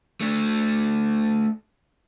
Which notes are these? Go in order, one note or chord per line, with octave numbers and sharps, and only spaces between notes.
A3 D4